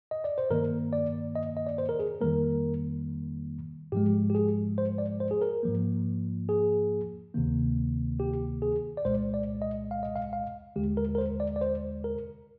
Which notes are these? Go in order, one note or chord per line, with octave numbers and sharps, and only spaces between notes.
D#5
D5
C5
G2 D#3 A#3 A#4
D5
D#5
D#5
D5
C5
A#4
G#4
F2 D#3 G3 A#3 A#4
G#2 F3 G#3 G4
G4
G#4
C5
D5
C5
G#4
A#4
G#2 F3 A#3
G#4
D2 C3 D#3 A#3
G4
G#4
D5
C2 A#2 G#3 C5
D5
D#5
F5
D#5
F5
F5
D#2 D3 G#3 G4
A#4
A#4
C5
D5
D5
C5
A#4